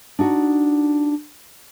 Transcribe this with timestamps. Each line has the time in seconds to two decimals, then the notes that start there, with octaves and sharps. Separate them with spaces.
0.19 D4 D#4 F#4